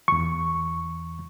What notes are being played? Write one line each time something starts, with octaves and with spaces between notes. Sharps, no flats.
E2 C#6